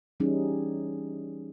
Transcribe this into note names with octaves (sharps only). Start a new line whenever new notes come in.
E3 G3 C#4 D#4 G#4